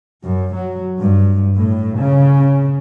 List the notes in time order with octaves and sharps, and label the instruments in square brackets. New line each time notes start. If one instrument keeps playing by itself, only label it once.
[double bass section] F#2
F#3
G2
A2
C#3